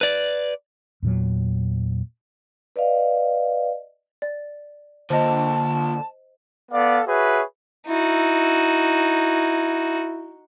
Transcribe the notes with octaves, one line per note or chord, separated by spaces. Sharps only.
B4 D5
E2 A#2 F#3
B4 D5 D#5 F5
D5
A#2 D3 F3 C5 D#5 A5
B3 A4 D5 F5
F#4 G#4 B4 C#5 E5
D#4 E4 F#4